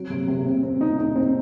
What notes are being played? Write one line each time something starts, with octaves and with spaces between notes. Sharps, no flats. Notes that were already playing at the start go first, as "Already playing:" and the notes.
Already playing: F#3 C4
C3
C3
C4
C4
D#4
D#4
C4